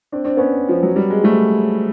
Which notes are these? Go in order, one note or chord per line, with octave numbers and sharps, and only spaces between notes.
C4 D4
C4 D4
B3 C#4
F3
F#3
G3
G#3
G3 A3